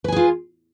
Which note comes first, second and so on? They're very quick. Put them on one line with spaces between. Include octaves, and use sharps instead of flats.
B4 G#5 G#4 F4